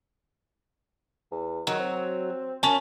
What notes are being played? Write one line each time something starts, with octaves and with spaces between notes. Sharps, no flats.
E2
D#3 F#3
C4
F#2 C#4 A5